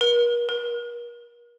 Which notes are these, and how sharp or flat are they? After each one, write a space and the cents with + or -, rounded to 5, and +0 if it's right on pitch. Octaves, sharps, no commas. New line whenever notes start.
A#4 +45
A#4 +40